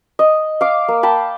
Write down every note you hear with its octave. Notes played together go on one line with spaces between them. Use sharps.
D#5
F5 D6
A#3
G5 A5 B5